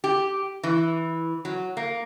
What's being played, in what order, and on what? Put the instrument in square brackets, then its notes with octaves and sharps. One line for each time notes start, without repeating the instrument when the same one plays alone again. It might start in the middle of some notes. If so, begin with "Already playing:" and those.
[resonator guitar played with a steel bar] G4
E3
F#3
A#3